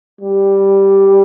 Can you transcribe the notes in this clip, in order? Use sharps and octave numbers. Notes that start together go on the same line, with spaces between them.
G3